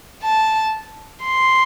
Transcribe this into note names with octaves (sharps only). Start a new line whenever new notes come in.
A5
C6